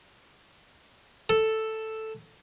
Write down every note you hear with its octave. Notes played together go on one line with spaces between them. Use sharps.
A4